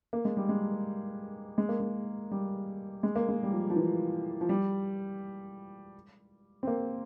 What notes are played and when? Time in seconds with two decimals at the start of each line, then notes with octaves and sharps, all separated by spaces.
0.13 A#3
0.25 G#3
0.37 G3
0.49 G#3
1.58 G#3
1.69 A#3
1.80 G#3
2.31 G3
3.03 G#3
3.16 A#3
3.28 G#3
3.43 G3
3.52 F3
3.70 F3
3.76 E3
4.41 F3
4.49 G3
6.63 C4
6.67 A#3